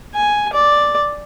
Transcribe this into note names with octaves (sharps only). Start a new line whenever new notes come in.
G#5
D5